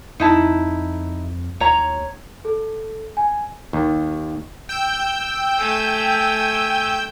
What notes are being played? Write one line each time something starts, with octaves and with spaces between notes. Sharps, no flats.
F2 D#4 E4 A5
D#2 C#5 A#5
A4
G#5
D#2
G5 E6 G6
A3 G#5